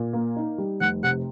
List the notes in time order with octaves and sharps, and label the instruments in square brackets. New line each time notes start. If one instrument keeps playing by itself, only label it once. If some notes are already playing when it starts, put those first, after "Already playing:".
Already playing: [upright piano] A#2
A#3
D#4
G3
[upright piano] F1 [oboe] F#5
[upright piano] C3 [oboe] F#5